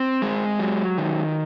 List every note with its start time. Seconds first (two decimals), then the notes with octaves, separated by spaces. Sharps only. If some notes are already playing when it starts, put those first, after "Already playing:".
Already playing: C4
0.22 G#3
0.59 F#3
0.98 D#3